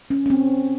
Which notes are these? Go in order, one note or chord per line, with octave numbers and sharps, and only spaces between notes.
C#4
C#4
C4